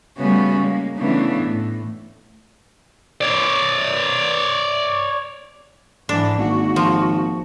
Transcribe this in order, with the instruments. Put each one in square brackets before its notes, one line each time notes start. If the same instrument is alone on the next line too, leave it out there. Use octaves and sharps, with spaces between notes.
[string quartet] C#3 G3 A3 B3 C#4 F#4
G#3 A#3
C#3 E3 A3 B3 D4
A2
[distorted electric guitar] C#5 D5
[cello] G#2 E3 [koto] D4
[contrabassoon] G#1 [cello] A#3 F#4
[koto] F3